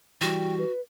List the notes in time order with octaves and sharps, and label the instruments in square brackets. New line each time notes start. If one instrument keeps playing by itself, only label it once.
[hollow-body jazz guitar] E3 G3 [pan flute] F#4 [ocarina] G5
[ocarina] B4